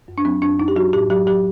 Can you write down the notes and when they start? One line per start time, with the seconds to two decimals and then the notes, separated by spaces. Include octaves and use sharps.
0.08 F#2
0.18 D4
0.25 F#3 C4
0.42 F#2 D4
0.59 F#2 D#4
0.68 G4
0.76 F#3 F#4
0.93 A2 G4
1.10 F#3 G4
1.27 F#3 G4